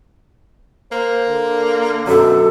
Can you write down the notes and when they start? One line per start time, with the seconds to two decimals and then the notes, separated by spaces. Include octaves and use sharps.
0.92 A#3 C5
1.28 D3
2.07 F#2 B2 A4